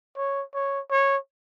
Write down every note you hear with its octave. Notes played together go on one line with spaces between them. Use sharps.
C#5
C#5
C#5